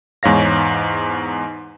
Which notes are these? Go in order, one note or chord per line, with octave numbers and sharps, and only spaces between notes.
E2 G#2 C#5 F5 A#6